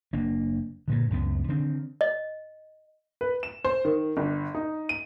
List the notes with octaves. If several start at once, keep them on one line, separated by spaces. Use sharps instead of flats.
F#1 A#3 D4
G2 A#2 D3
C#2 F#2 A3 B3
D3 D#3 C4 D4
D#5
B4
E7
C5
D#3
G1
D#4
D#7